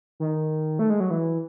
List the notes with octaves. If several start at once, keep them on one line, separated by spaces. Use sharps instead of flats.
D#3
A3
G#3
F#3
E3